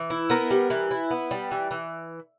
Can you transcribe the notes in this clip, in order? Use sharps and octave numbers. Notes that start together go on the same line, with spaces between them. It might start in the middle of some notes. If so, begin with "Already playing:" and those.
Already playing: E3
E4
B3 A#4
G3
E3
E4
B3
G3
E3
E3